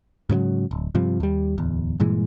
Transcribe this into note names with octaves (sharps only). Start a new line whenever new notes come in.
G#2 C#3 E3 F#3
D1
G2 C3 F3
D#2 G3
D1 E2
G2 A#2 E3 G#3